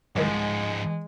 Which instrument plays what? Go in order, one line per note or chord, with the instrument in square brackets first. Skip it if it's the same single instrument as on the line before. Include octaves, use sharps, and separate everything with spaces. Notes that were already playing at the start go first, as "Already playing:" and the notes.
[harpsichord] C2 D#3 F#3 [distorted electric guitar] G#2 F3 [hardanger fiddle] G#3